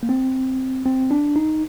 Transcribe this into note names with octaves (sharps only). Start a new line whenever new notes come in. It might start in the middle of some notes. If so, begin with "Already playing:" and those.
A#3
C4
C4
D4
D#4